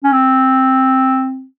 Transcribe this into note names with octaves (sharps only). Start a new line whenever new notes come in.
C#4
C4